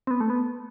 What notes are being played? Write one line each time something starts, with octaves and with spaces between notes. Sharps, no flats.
C4
B3
A3
B3